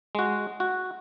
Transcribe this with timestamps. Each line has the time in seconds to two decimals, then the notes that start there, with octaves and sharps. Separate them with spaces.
0.15 G#3 F#4
0.60 F#4